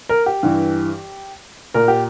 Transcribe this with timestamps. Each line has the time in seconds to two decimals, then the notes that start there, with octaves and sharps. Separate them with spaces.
0.09 A#4
0.26 G4
0.43 G2 E3
1.74 A#2 A#4
1.88 G4